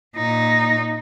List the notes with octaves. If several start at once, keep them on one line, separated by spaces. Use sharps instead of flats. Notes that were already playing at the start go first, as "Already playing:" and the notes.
A#2 D#4